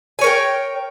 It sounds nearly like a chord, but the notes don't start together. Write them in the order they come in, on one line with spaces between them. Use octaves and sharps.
G#5 C#5 A#4 G5